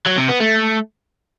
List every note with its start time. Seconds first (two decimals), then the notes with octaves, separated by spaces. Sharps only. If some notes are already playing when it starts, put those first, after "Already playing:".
0.07 F#3
0.18 C3
0.29 B3
0.40 A3